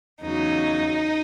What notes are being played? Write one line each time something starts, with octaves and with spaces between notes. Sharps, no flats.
E2 C#3 F#3 D#4